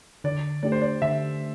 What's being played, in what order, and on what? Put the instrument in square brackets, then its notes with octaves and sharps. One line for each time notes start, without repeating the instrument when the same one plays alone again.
[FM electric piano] D3 [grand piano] D5
[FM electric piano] A3 D4 G4 [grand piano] D5
[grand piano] C5
D5
[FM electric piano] D3 [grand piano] E5